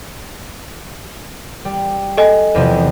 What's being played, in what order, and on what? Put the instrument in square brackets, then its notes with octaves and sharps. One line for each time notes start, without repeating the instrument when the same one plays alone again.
[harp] G3
[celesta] A4 D#5 G#5
[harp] E2 C3 F3